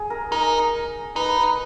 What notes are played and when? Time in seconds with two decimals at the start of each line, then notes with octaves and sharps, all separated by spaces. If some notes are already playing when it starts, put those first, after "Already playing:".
Already playing: G#4
0.10 A#4
0.32 D#4 A#4
1.16 D#4 B4
1.37 B4